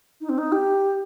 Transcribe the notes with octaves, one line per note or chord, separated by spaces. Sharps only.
D#4
C4
D#4
G4